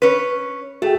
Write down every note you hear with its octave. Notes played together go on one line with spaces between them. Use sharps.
C#4 B4
A3 F#4 G#4 G5